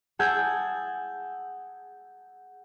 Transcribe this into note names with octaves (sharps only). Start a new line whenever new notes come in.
G#4 F#5 A5 E6 G6 G#6